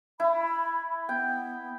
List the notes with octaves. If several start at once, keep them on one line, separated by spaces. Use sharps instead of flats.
E4 B5
B3 G5